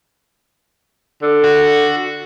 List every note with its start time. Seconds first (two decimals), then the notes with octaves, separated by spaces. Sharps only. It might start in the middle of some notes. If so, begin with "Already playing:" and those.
1.23 D3
1.44 F#4